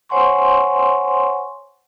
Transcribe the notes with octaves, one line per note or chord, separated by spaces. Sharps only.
C5 C#5 F#5 G#5 C6 C#6